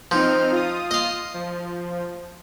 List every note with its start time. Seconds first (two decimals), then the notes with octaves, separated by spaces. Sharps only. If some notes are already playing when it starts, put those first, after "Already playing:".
0.11 F3 C4 D#4 F6
0.52 F4 D#6
0.91 D#5 F5
1.34 F3